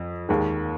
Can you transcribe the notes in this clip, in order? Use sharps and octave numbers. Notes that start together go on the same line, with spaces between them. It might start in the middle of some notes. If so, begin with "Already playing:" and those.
Already playing: F2
D#2 D#3 G#3